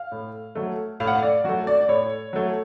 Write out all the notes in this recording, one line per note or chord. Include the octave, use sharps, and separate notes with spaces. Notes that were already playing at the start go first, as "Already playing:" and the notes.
Already playing: F5
A2
F#3 A3
A2 F5
F#5
F5
D5
F#3 A3 F#4
D5
D5
A2 C#5
F#3 A3